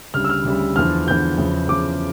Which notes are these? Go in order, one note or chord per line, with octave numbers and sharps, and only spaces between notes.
D2 C#3 G3 F6
E6
F6
D2 C#3 G3
E2 D3 F3 F6
E2 D3 F3 G6
E2 C#3 F3
E2 C#3 F3 D6